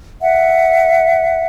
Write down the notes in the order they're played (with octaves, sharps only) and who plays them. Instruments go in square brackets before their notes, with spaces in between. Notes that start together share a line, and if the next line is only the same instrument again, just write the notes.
[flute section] E5 F#5